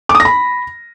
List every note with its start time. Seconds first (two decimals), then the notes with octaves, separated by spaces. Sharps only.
0.09 D6
0.15 D#6
0.20 A#6
0.25 B5